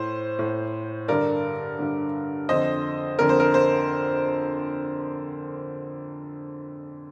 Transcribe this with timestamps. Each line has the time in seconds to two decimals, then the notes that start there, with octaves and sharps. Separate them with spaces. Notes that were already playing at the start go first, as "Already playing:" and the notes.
Already playing: A2 C5
0.39 A2
1.08 G2 D3 A#4 D5
1.79 G2 D3
2.48 F2 D3 C5 D#5
3.19 F2 D3 A#4
3.29 C5
3.40 A#4
3.54 C5